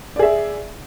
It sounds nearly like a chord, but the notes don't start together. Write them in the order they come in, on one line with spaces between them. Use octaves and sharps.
D5 G#4 E5